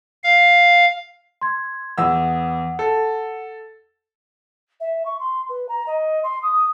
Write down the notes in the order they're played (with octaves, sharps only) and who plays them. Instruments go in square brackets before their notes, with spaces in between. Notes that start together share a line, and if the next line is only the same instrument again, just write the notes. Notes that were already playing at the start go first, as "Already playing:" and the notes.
[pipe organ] F5
[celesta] C6 G#6
[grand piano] E2 E6 [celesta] F#5
[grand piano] A4
[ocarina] E5
C#6
C6
B4
A#5
D#5
C6
D#6